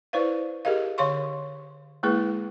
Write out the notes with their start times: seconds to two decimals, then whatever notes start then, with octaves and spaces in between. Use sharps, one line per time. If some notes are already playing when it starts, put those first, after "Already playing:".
0.13 E4 B4 C5 D5 F5
0.65 G4 G#4 A#4 D#5 F5
0.98 D3 C#5 F5 C6 C#6
2.03 G#3 A#3 E4 G#4 B4